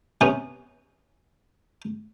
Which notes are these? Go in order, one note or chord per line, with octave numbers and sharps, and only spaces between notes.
C3 B3 C#4